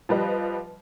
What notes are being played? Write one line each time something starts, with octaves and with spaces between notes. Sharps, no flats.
F3 G3 B4 D#5